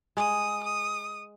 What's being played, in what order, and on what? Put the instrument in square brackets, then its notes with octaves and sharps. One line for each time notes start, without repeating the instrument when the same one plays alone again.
[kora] G#3 [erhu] D#6
[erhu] D#6